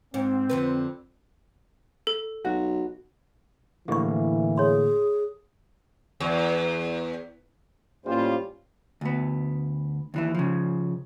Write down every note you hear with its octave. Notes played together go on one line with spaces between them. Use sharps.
G#2 C4
F2 D3 B4
A4
B1 F#4
A2 D3 E3 A#3 G4 D#5 C#6
G#4 C#5 C6
E2
A2 G3 A#3 C#4 F4 C5
D2 B3
D#2 E3 E4
C#3 F3